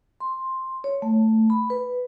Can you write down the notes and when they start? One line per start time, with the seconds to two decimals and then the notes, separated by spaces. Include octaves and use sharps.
0.20 C6
0.84 C#5
1.02 A3
1.50 B5
1.70 B4